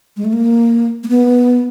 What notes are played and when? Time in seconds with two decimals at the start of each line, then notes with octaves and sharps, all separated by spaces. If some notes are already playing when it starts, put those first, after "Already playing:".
0.17 G#3
0.25 A3
0.33 A#3
1.04 A#3
1.09 B3